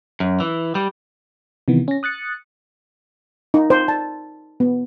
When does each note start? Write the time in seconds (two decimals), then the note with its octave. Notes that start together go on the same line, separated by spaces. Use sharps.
0.20 F#2
0.40 E3
0.75 G3
1.68 C3 D#3 E3 B3
1.88 C#4 A#6
2.03 D#6 F#6 A6 C#7
3.54 D#4
3.70 C5
3.88 A5
4.60 B3